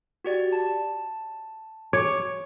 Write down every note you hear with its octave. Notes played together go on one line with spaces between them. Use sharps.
F#4 G4 D5
A5
C#5 D6